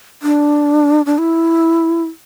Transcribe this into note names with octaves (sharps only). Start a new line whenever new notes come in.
D4
D4
E4